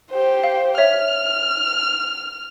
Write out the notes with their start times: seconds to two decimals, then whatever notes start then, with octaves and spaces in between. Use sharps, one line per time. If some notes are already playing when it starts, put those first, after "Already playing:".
0.11 G4 C5
0.43 F5
0.78 C#5 E5 F6